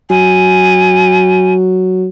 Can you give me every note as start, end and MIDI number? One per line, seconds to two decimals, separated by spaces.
0.10 2.08 54
0.10 1.54 80